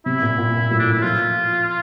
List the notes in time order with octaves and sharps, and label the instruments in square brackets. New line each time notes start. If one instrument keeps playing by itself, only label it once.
[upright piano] C3 [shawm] E4
[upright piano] A#2
A#2
A#2
A2
[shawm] D4
[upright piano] A#2 [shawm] E4
[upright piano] F3 [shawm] F4